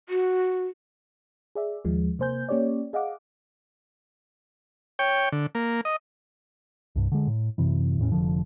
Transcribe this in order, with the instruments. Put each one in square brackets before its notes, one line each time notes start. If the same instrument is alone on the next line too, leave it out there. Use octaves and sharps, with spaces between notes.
[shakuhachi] F#4
[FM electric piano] G#4 D5 E5
D#2 F3 G#3
C3 A#3 C5 G#5 G6
A#3 C#4 G4 C#5 D5
G#4 D#5 F5 F#5 D6
[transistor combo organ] C#5 G5
D3
A#3
D#5
[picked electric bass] C2 G2
D3 G#3
A2
F#2 C3 E3
E2 A2 C#4
F1 A#1 D3 F3